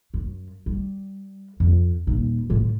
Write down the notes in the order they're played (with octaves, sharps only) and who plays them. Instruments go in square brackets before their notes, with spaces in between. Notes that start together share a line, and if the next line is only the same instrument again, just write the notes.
[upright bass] F#2
G3
F2
D#1 D#4
A2 D3